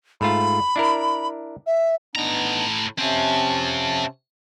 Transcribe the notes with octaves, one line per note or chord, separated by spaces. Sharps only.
G#2 A3 F4 B5
D4 E4 A#4
E5
A2 B3 D4 D#4 A#5
C3 C4 C#4 F5 A5